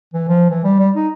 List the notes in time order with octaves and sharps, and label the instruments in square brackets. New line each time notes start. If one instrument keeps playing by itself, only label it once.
[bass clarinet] E3
F3
E3
G3
G3
D#4